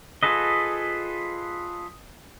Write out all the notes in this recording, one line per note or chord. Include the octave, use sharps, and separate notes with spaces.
F4 G#4 A4 B4 D#5